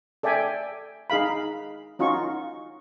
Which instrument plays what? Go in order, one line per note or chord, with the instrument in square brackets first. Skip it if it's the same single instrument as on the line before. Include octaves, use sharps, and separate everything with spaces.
[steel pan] A4 D5 E5 G5 G#5
D#4 G#4 F5 B5
C#4 D#4 F4 F#4 C#6